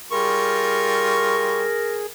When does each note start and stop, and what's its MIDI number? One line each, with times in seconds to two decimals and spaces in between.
0.12 1.63 55
0.12 1.63 65
0.12 2.06 68
0.12 2.11 70
0.12 1.63 85